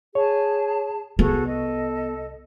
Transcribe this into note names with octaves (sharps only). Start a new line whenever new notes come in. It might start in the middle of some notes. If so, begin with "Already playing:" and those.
G#4 C#5 A5
C2 B3 F#4 G#4 A4
A4 D#5